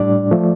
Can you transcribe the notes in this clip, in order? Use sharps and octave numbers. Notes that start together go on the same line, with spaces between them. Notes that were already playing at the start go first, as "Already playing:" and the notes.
Already playing: A2 G3 D4 D5
F3 A3